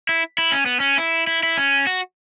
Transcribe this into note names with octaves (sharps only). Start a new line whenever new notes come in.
E4
E4
C#4
B3
C#4
E4
E4
E4
C#4
F#4